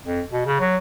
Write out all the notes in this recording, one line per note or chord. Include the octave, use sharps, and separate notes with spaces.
F2
B2
C#3
F#3